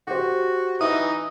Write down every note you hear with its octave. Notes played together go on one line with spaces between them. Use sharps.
F#4 G4 C5
E3 D#4 E5 D#6